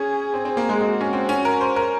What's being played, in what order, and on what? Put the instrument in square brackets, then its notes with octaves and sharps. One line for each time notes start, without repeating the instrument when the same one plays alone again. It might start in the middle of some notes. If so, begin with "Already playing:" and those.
Already playing: [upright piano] C#4 [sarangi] G#4
[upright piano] C4
C4
A#3
G#3
[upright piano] G#3 [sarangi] F#4
[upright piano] C#4
C4
C#4
A#4
C5
A#4